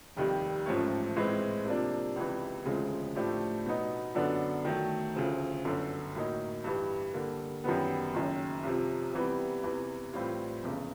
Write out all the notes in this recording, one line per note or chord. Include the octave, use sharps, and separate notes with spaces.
F1 D#2 D#3 G3
A1 G#2 F3 A3 C#4
A2 E3 G#3 C4
C3 F3 A#3 D4
C#2 C3 E3
E1 D2 C#3 F3 G#3
A2 F3 A3 D4 G4
B2 F#3 B3 D#4
F#2 D3 F#3 B3 D4
D#3 F#3 A3
D2 C#3 F3
G1 F#2 D3
A2 F#3 A#3 D#4
G2 E3 G3
D3 G3 A#3
F#2 D#3 G3 B3
F#1 F#2 D#3
C2 C3 F3
C3 E3 G3 B3
E2 C3 E3
A2 E3 G3 C4 F4
F1 E2 C#3